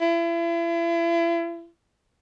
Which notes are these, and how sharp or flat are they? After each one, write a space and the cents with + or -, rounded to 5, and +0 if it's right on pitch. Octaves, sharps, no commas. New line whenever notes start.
E4 +40